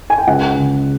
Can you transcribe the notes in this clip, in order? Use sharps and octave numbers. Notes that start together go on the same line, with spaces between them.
G#5
G5
C#2 F#5
C#3